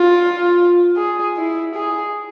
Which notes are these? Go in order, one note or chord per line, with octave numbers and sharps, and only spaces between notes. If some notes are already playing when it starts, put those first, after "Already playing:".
Already playing: F4
G#4
E4
G#4